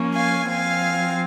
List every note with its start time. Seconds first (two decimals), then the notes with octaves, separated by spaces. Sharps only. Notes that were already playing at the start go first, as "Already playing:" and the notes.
Already playing: F3 A#3 C#4
0.15 F5 G#5
0.49 F3 C4 F5 G#5